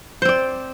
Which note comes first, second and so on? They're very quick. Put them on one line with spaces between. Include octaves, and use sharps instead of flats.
C5 C4 D5